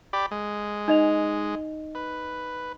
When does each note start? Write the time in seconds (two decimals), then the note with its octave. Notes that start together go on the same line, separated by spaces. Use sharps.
0.13 G4 D5 B5
0.31 G#3
0.88 D#4 D#5 F7
1.95 B4